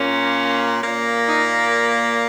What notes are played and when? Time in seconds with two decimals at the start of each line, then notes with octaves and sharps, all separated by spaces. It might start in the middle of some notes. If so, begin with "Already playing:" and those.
Already playing: A#2 A#3 C#4
0.81 A#2 A#3
1.28 D#4